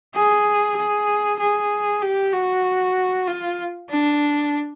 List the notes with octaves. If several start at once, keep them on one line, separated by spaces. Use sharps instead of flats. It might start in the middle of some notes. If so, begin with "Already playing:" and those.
G#4
G#4
G#4
G4
F#4
F4
D4